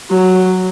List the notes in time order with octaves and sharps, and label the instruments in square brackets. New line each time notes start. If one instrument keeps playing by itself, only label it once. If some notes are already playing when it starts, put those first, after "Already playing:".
[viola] F#3